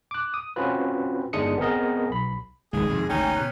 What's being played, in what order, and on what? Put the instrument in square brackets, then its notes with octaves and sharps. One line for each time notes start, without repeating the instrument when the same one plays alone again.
[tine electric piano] D6 F#6
D#6
C4 C#4 F4 F#4 B4
G1 G#2 G#3 D4 D#6 C#7
B3 C4 G#4 A#4 D#5
B1 B5
[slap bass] F1 C#2 [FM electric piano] D#3 G#3 [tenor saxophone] G#4
[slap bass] F2 G#2 D#3 [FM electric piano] C3
[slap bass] G#1 D2 D#3 [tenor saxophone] C#4 [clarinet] D#4 [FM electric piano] G5 G#5
[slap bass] B2 [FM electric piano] F#6